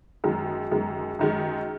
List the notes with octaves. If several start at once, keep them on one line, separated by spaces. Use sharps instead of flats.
F#2 D#3 G#3
F#2 D#3 G#3
F#2 D#3 G#3